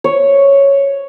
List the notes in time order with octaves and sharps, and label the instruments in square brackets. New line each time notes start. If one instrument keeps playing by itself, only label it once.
[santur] C#5